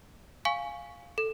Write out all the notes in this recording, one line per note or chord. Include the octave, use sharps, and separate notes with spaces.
F5 G#5 C#6
A4